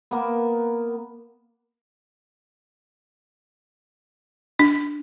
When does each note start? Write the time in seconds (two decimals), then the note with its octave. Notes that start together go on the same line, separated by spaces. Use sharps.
0.11 A#3 B3
4.59 D4